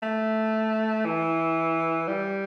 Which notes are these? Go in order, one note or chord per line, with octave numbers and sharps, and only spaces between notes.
A3
E3
G3